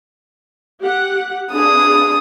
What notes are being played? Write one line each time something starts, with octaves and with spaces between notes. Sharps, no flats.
G4 F#5
D4 G#4 D#6